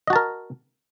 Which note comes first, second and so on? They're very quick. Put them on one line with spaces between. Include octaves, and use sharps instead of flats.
D#5 F#4 A5 A#4